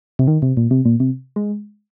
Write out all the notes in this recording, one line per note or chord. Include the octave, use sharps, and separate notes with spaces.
C3
D#3
C3
A#2
C3
A#2
C3
G#3